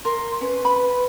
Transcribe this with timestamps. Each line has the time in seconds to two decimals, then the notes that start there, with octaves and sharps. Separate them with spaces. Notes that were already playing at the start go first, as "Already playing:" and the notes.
0.05 A#4 C6
0.41 C#4 B4
0.65 B5